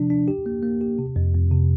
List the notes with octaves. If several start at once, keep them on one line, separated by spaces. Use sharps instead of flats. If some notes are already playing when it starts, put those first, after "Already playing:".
Already playing: C3 F3 D4
D4
G4
A#3
A#3
G4
C3
F2
F2
C3